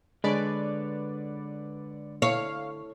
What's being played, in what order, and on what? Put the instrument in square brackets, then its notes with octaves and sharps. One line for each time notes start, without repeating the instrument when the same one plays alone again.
[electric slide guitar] D3 [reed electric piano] G#3 D4 C#5 [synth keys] B4 D5
[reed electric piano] E4 A4 [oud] C#5 [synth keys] F5